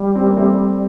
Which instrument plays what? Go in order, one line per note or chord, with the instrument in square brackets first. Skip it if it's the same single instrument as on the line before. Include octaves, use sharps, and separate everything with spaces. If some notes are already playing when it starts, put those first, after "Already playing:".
Already playing: [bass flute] G3
[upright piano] C4
A#3
A3 C4